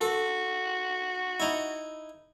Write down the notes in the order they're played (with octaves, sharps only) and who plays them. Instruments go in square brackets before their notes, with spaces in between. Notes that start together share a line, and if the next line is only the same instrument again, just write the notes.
[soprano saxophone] F#4 [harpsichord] A4
[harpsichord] D#4 E4